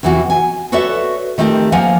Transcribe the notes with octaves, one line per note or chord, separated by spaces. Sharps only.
E2 C3 E3 B3 F#4
G#5
F#4 A4 B4 C#5 D5 E5
D#3 A3 C4 G4 A#4
F3 A#3 F#5 G#5